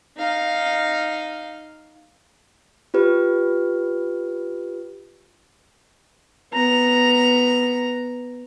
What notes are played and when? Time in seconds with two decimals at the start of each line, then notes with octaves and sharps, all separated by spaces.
0.17 D#4 F5
2.94 F4 G4 B4
6.53 B3 A#5